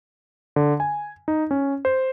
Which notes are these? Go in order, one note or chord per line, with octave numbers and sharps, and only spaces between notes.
D3
G#5
D#4
C#4
C5